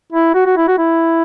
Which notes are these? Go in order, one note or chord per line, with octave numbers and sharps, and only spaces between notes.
E4
F#4
F#4
E4
F#4
E4